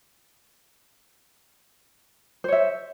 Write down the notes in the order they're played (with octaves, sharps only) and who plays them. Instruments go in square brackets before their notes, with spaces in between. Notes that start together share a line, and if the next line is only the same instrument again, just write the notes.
[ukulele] C5
C#5
E5